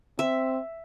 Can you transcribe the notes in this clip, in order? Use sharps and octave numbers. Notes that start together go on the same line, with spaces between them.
C4 E5